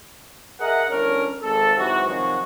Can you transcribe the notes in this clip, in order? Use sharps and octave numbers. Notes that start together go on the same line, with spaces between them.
G#4 A#4 D#5 E5 F#5
G1 C#4 D4 A#4
G#1 A4
G#2 C3 E3 F#3 F#4
C3 D#3 F3 F#3 G#3 F#4